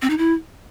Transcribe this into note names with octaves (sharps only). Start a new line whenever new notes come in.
C4
D#4
E4